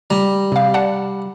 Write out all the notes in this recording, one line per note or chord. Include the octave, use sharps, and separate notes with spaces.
G3 A#5
C3 F5
D5 F#5 A5